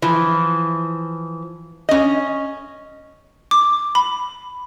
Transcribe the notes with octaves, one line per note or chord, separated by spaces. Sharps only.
E3 F3
C#4 D#5
D6
B5